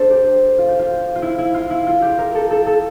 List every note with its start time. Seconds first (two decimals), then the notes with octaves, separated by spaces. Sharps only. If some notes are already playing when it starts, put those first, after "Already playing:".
Already playing: D4 A4 C5
0.10 G4
0.58 F4
0.69 G4
0.79 F4
1.15 F4
1.22 E4
1.38 E4
1.54 F4
1.70 E4
1.87 F4
2.02 G4
2.19 A#4
2.35 A4
2.51 A4
2.66 A4